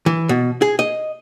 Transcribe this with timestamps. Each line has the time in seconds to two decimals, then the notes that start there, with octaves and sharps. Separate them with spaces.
0.06 E3
0.29 B2
0.62 G#4
0.79 D#5